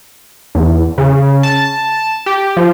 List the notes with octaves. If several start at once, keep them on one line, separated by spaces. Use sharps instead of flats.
E2
C#3
A5
G4
F3